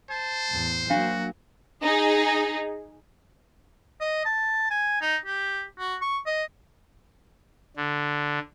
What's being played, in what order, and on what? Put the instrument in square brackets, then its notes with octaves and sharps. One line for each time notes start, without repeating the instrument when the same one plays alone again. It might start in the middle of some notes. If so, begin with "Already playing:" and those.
[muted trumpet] C5 [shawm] A5
[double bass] E2 A2
[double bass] F#3 A#3 [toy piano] D4 F5 [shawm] F#4
[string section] D#4 G#4
[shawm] D#5
A5
G#5
D#4
G4
F#4
C#6
D#5
[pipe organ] D3